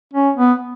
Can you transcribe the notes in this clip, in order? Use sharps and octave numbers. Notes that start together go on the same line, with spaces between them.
C#4
B3